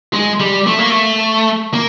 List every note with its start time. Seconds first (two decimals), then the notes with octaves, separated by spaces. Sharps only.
0.13 G#3
0.40 G3
0.67 A3
0.79 A#3
0.90 A3
1.73 A#3